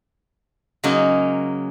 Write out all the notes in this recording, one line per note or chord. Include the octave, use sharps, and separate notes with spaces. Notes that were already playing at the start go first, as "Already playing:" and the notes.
C#3 F#3 G#3 A#3 C#4 D#4